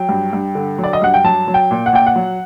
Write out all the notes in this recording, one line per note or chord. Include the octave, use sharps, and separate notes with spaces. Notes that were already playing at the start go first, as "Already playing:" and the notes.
Already playing: F#3 G5
G2
G2
D3
F#3
D5
D#5
G2 F#5
G5
F#3 A5
F#3
G5
A#2
F#5
A#2 G5
F#5
F#3